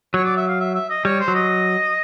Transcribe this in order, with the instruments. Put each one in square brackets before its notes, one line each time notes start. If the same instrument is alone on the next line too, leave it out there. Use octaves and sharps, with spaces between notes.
[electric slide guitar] F#3 [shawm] C#5
[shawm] D5
E5
F5
E5
E5
D#5
[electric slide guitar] G3 [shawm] C#5
[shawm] C5
[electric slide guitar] F#3
[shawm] D#5